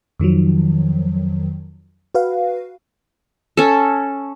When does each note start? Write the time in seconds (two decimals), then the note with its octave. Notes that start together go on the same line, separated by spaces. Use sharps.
0.19 F2 D#3 F3 F#3
2.15 F#4 B4 F5
3.57 C#4 A4